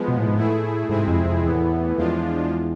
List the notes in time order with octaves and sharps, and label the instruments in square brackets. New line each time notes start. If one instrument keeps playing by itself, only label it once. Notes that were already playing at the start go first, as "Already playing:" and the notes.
Already playing: [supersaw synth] F3 G#3 B3
[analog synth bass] B2
A2
G#2
[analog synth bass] A2 [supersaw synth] A3 E4 G#4
[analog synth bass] G#2 [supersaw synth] C3 G#3 C4 E4 G#4
[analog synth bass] F2
F2
[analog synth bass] E2 [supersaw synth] A2 E3 B3
[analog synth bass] E2 [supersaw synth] F3 G#3 D4 F4